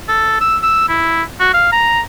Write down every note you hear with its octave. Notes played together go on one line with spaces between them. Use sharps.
A4
E6
E6
E4
F#4
F5
A#5